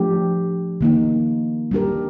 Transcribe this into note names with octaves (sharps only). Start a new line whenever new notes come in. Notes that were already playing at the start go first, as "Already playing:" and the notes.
Already playing: F3 A3 D4 G4
D#3 A#3 D#4
G3 D4 G4 A#4